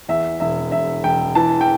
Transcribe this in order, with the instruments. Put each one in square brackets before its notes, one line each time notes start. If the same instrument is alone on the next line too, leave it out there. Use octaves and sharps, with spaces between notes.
[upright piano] E2 E5
E1 E5
E1 E5
E1 G5
E3 A5
G5